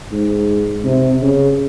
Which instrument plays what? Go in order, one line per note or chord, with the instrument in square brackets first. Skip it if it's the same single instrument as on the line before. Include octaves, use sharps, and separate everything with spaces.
[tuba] G#2
C3
C#3